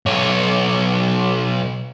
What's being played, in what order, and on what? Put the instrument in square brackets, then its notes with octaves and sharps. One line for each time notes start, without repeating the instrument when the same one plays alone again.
[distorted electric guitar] B1 C#5